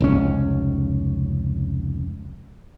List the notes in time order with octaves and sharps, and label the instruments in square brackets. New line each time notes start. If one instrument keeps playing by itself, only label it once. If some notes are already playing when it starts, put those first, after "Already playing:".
[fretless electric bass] F1 C#2 C#4